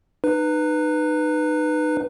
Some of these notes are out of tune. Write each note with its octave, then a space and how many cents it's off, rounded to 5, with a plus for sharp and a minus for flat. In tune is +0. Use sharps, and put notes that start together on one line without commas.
D#4 -30 B4 +0